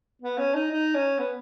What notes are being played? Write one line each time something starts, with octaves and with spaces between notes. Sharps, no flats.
B3
C#4
D#4
D#4
C#4
B3